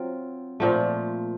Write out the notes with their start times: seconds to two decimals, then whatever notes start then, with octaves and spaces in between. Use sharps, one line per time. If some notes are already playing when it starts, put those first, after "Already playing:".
Already playing: F#3 C4 F4
0.60 A#2 F3 A3